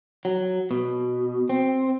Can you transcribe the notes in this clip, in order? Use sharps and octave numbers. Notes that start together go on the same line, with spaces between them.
F#3
B2
C4